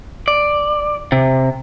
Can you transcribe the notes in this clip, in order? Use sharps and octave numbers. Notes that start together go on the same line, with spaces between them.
D5
C3